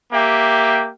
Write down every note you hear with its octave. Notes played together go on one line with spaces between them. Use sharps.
A#3 G4 E5 G5